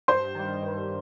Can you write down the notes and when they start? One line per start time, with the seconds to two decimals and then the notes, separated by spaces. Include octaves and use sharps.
0.08 G2 C5 C6
0.35 D#3 G3
0.63 G2